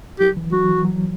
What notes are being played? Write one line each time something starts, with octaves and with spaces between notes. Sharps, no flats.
F#3 G4
E3
F#3 F#4
E3
F#3